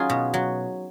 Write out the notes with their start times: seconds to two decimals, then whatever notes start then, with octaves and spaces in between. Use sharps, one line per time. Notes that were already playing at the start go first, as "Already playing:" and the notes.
Already playing: F#3 C#4 D#4 F4 G#4
0.10 B2
0.34 F#3